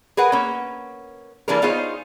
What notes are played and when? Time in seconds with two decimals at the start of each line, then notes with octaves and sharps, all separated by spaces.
0.17 G#4 A#4 B4 F#5
0.32 A#3 C#4
1.48 E3 G3 A#3 D4 G#4 A#4
1.62 B3 D#4 F4 G#4 C5 C#5